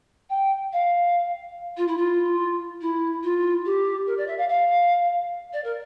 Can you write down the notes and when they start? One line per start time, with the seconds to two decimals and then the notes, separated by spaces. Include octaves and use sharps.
0.30 G5
0.73 F5
1.77 F4
1.88 E4
1.97 F4
2.81 E4
3.23 F4
3.65 G4
4.07 A#4
4.18 D5
4.27 E5
4.38 F5
4.49 F5
5.53 D5
5.64 A#4